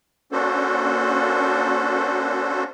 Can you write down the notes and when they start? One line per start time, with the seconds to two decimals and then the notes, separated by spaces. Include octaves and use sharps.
0.32 A#3 C#4 D4 F#4 A4 C5